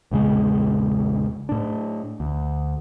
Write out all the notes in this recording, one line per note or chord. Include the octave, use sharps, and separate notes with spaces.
A#1 E2 C#3 G#3
A2 D4
D2